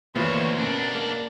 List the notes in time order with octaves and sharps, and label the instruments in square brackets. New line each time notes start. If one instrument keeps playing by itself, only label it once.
[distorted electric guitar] D2 [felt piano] A#2 E3 [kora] B3 F4 F#4 [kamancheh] C5 C#5
[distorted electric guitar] B2 D4 [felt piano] C#4 [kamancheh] A#4
[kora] A#3